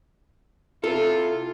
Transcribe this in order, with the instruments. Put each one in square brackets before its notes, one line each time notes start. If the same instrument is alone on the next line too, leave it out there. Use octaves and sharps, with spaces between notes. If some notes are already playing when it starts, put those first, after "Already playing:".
[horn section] C3 E4 F4 [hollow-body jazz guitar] A4